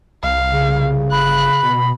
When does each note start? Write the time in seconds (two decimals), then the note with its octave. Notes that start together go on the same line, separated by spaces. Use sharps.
0.23 C2 F5
0.53 C#3
1.12 G1 B5 F#6
1.63 B2